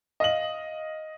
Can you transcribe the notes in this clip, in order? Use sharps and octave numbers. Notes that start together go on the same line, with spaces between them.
D#5 F5 F#7